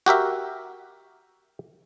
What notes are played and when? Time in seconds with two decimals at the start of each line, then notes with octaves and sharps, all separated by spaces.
0.06 F#4 G4 A#4 E5